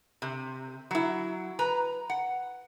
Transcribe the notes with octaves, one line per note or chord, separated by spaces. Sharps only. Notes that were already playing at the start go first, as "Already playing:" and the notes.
C3
F#3 E4
B4 A#5
F#5